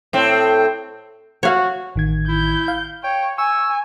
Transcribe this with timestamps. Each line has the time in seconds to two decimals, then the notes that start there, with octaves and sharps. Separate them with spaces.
0.13 A2 C4
1.43 F#4 C#5 F5
1.95 A1 D#3 G#6
2.28 E4 G6
2.68 F5
3.04 C#5 G5
3.38 G#5 C#6 E6